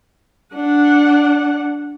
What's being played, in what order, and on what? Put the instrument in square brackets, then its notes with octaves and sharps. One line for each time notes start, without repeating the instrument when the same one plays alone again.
[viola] D4 F#5